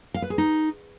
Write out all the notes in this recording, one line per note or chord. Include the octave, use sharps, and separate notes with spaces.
F5
B4
G#4
D#4